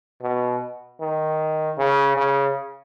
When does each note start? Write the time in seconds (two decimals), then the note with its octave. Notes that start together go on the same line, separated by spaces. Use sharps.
0.22 B2
1.01 D#3
1.78 C#3
2.17 C#3